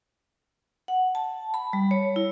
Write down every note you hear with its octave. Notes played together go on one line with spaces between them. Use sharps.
F#5
A5
B5
G3
C#5
E4